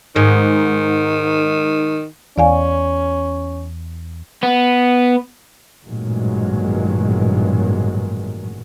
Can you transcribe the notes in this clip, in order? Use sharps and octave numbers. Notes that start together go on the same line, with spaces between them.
G#2 D#3
E2 C#4 D5 F5 G#5
B3
A1 G2 A#2 D#3 F#3 G#3